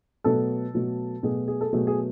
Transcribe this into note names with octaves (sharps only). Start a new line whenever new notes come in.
B2 F#3 A3 A4
B2 F#3 A3
B2 F#3 A3 G#4
G#4
A4
B2 F#3 A3 G#4
G#4